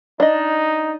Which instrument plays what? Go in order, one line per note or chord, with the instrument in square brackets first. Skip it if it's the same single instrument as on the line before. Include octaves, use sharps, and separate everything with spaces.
[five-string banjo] D4 D#5 [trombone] D#4